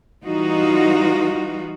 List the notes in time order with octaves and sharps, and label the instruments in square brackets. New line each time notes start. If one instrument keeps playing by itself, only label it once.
[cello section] E3 G3 D#4 F4 F#4